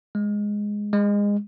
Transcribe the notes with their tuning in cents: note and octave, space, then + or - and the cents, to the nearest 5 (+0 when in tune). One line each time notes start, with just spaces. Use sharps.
G#3 -5
G#3 -25